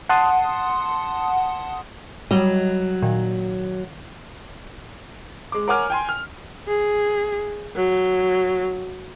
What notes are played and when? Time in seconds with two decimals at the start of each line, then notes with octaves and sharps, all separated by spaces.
0.09 F#5 A5 C6 D#6
2.31 F#3 G3 D#5
3.02 A#2 D#3
5.52 G#3 D6
5.68 A#4 C#5 F#5 G#5 D6 F6
5.90 G5 G#5 C6
6.09 F6
6.68 G#4
7.76 F#3